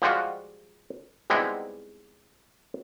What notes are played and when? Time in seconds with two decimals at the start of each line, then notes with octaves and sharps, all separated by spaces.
0.02 F3 G3 G#3 F4 F#4
1.30 G3 G#3 B3 C4 D#4 E4